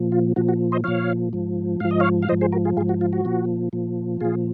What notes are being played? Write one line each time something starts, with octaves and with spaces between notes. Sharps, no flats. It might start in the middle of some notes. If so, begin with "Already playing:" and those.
Already playing: A#2 F3
F4
A#2 F3 F#4
F#4
C5 D#5
A#2 F3 C#5 F5
G#2 F3
G#2 F3 F5
D#5
C#5 F5
F5
G#2 F3 C5 D#5
G#4 C5
F#4 A#4
F4 G#4
G#2 F3 F4 G#4
F#4
F4
F#4
A#2 F3
A#2 F3
A#2 F3 F4 G#4